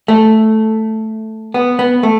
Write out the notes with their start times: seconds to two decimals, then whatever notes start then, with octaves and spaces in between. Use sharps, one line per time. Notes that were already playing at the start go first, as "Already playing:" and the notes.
0.08 A3
1.54 B3
1.79 B3
2.03 A3